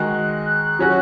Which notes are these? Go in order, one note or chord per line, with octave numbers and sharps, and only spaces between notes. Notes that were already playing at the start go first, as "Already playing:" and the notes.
Already playing: D#3 G#3 D#4 F#4 F#6
F#3 C#4 F#4